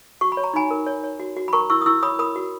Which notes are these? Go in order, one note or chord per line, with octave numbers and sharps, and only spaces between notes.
F#4 C#6
B5
C#5
A#5
D#4 G#5 B5
A#4
C#5
C#5
F#4
F#4
B5
A#4 A#5 C#6
E4 C#6 E6
D#6
E4 C#6 E6
C#5 B5 D#6
A#4 B5 D#6
F#4